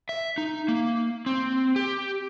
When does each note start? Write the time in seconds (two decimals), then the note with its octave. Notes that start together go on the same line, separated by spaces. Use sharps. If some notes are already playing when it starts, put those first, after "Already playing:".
0.09 E5
0.38 D#4
0.68 A#3
1.26 C4
1.76 G4